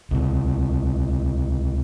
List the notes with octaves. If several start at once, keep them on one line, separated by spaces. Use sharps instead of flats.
C#2 C3